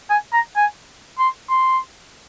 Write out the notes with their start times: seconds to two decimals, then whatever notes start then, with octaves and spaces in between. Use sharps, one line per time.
0.10 G#5
0.33 A#5
0.56 G#5
1.19 C6
1.50 C6